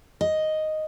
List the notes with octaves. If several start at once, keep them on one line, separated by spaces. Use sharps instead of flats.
D#5